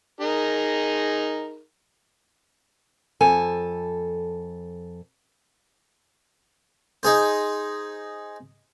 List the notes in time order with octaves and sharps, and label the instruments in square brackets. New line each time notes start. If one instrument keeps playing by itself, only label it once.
[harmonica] D#4 G#4 A#4
[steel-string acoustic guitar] F2 A4 G#5
[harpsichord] D#4 G#4 C5